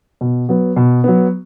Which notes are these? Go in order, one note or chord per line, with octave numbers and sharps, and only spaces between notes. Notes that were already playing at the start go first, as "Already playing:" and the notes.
B2
F#3 B3
B2
F#3 B3